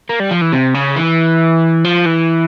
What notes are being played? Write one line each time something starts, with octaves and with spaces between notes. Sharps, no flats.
A#3
G3
F3
E3
C3
C#3
E3
F3
E3